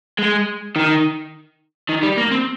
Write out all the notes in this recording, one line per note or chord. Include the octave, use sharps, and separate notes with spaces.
G#3
D#3
D#3
G3
A#3
C4